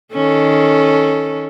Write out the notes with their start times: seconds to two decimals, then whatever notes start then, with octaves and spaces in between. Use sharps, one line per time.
0.14 D#3 C#4 A4